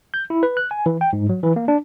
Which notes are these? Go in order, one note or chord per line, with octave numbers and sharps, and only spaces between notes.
G6
E4
B4
F#6
G#5
E3
G5
G#2
F#3
E3
A#3
D4